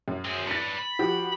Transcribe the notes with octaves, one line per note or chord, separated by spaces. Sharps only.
F#2
C4 G#4
D4 B4 A6 C#7
B5
F3 F#4 G4